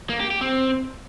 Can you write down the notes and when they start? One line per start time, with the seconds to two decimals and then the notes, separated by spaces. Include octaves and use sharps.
0.09 A#3
0.20 G4
0.31 G4
0.41 C4